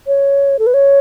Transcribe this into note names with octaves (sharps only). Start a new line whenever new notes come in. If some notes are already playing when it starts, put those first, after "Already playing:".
C#5
A4
B4
C#5